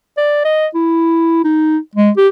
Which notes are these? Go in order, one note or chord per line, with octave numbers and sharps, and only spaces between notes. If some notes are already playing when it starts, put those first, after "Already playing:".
D5
D#5
E4
D#4
G#3
G4